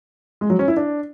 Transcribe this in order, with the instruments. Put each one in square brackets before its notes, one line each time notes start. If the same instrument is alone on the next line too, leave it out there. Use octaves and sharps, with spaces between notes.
[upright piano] G#3
F#3
C#4
E4
D4